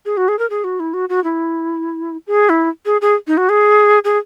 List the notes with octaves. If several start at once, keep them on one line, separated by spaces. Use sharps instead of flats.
G#4
F#4
G#4
A#4
G#4
F#4
E4
F#4
F#4
E4
G#4
E4
G#4
G#4
D#4
F#4
G#4
G#4